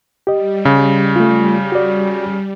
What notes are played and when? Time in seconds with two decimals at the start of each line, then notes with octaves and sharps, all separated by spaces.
0.27 G3 G4 D#5
0.65 C#3
1.16 A3 F4
1.72 F#4 D5